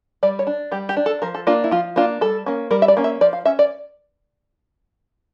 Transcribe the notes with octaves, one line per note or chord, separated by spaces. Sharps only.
G3 D5
C#5
D4
G3 G4
G4
D4
A4
F3 A#4
A4
A#3 D4 F4
E4
F3 F4
A#3 D4 F4
G3 A4
A#3 C#4
G3 A#4
E5
D5
A#3 C#4
E5
F3 D5
F5
C#4 E5
D5